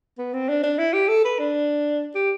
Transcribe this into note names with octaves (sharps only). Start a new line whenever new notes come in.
B3
C4
D4
D4
E4
G4
A4
B4
D4
G4